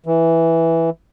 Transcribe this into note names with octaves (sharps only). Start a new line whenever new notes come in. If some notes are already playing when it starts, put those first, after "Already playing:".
E3